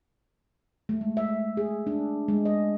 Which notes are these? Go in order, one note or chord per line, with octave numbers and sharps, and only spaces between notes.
A3
G#3
E5
G#4
D4
G#3
D#5